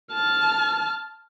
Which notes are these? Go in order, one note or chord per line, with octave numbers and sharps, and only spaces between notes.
A5 F6